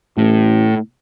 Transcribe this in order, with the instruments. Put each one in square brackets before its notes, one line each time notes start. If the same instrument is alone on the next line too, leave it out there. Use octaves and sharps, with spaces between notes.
[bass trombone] A1 [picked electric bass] A2